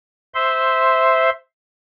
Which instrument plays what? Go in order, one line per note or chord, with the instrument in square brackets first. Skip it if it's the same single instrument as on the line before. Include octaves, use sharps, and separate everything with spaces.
[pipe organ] C5 E5 C6